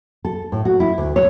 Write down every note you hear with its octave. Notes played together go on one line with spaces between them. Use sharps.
A4
A2
F#4
E4
D2
C#5